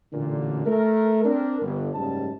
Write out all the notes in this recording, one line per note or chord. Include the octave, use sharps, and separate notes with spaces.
A1 A#2 D3
A3 A#4
C4 D4 A#4
G1
F#1 G#2 C#3 G3 A5